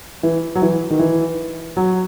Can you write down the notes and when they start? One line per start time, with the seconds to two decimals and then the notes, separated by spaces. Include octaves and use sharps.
0.23 E3
0.55 F#3
0.62 E3
0.90 D#3
0.99 E3
1.77 F#3